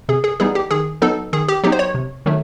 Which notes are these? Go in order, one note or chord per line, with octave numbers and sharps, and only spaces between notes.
C3 G#4
G#4
E3 G3 B3 D#4 G#4
G4
D#3 G#4
F#3 B3 D#4 A4
D#3 G#4
G4
F#3 B3 D#4 G4
C5
C#5
C3
D#3 F#3 A3